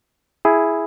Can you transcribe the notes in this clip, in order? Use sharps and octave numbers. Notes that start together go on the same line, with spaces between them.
E4 G#4